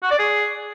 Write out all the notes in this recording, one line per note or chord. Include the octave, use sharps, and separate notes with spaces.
F#4
D5
G#4